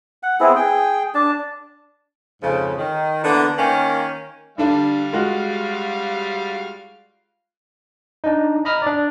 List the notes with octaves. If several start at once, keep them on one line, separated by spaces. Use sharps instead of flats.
F#5
B3 C4 E4 G#4
G#4 G5
D4 A5
F2 G#2 C#3
D#3
D3 E3 A#3 B3 D4
D#3 A#3 C#4
D3 G3 D4 F5
G#3 F4 F#4
D4 D#4
D#5 A#5 B5 D#6 F6
D4 D5